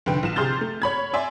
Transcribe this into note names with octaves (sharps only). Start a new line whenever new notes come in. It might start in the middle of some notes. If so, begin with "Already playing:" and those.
F1 D3 B4 G5
A#1 E7
C3 G#4 C6 F6 G6 A6
A3
C#5 B5 G#6
D5 E5 G#5 C6